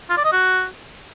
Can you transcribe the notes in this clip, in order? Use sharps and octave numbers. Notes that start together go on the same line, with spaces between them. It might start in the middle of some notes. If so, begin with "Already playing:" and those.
F4
D5
D#5
F#4